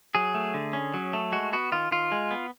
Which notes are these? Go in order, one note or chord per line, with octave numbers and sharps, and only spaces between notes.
F#3 G#4
A3
D3
C#4
F#3
A3
G#3 F#4
B3 F#4
D#3 F4
D#3 F4
G#3
B3